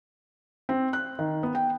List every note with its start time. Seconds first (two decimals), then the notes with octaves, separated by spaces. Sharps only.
0.69 C4
0.93 F#6
1.19 D#3
1.43 B3
1.55 G5